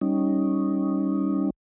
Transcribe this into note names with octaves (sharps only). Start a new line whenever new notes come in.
G3 C#4 D#4